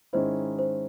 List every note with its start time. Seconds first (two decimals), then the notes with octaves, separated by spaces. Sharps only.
0.13 G#2 D#3 G#3 C#4 E4 C5
0.59 C5